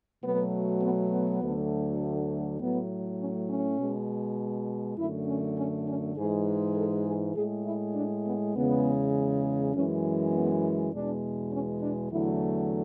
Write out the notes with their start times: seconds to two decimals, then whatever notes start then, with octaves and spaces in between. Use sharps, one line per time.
0.22 B2 F#3 A3 B3
0.81 B3
1.11 B3
1.42 D2 D3 F#3 A3
2.59 A2 F#3 A3 B3
3.19 C#4
3.49 C#4
3.79 B2 G#3
4.97 F#2 D3 A3 E4
5.28 C#4
5.58 C#4
5.88 C#4
6.16 G#2 E3 G#3 G#4
6.76 A4
7.06 G#4
7.35 A2 G#3 G#4
7.66 E4
7.95 D4
8.25 B3
8.55 E2 C#3 G#3 B3
9.73 F#2 E3 G#3 C#4
10.32 B3
10.92 E2 B2 G#3 D4
11.51 C#4
11.82 D4
12.11 E2 D3 F#3 A3 E4